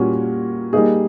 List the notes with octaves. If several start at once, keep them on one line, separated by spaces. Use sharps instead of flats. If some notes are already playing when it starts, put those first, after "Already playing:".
Already playing: A#2 G3 A#3 C#4 F#4
G3 A#3 D#4 G#4